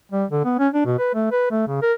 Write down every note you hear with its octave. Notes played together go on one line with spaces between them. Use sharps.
G3
D3
B3
C#4
D4
B2
B4
A3
B4
A3
C#3
A#4